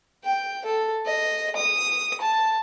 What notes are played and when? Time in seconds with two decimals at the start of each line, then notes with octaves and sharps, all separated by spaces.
0.24 G5
0.65 A4
1.06 D#5
1.56 D#6
2.21 A5